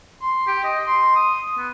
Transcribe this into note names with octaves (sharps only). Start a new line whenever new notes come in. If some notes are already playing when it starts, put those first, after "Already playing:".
C6
G4
D#5
C6
D#6
B3